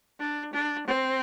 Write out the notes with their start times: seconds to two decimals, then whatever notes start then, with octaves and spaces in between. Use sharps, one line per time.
0.19 D4
0.53 D4
0.87 C4